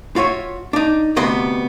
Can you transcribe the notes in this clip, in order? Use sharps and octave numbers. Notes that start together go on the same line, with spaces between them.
F4 F#4 C#5 E5
D4 D#4
D2 C3 B3 D#5 C6